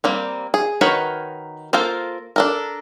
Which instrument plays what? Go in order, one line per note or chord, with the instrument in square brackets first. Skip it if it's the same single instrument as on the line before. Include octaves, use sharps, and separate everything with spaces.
[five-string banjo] G3 A#3 C4
G#4
D#3 F#4 A#4 B4 C#5
A#3 F4 A4 A#4 C5
D4 A4 A#4